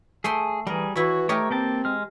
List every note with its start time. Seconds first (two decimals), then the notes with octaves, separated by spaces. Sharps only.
0.24 A3 G#4 G5 C6
0.67 E3 G3 G#4 A#4
0.96 E3 E4 F#4 C#5
1.29 A3 G4 A#4 C#5 D#5
1.50 A#3 C4 G5 A5
1.85 G#3 F6